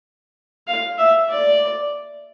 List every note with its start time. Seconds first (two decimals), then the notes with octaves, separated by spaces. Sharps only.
0.67 F5
0.98 E5
1.30 D5